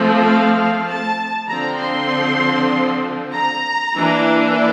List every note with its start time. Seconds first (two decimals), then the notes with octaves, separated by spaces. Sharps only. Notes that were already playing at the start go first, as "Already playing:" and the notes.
Already playing: F3 A3 C4
0.25 F5
0.55 F5
0.86 A5
1.47 D3 F3 C4 A#5
1.78 C6
3.33 A#5
3.95 E3 A#3 D4